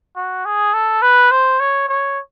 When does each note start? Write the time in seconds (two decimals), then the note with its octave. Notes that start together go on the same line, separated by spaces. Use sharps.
0.16 F#4
0.45 G#4
0.74 A4
1.02 B4
1.31 C5
1.60 C#5
1.89 C#5